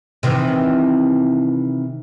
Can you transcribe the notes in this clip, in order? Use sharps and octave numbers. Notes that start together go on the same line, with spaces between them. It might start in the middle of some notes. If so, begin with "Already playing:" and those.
C3 D#3 E3